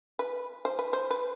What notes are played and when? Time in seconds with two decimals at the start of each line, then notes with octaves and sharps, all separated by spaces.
0.19 B4
0.65 C5
0.79 B4
0.93 C5
1.11 B4